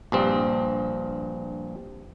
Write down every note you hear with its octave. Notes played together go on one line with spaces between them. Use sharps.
A#1 G2 C4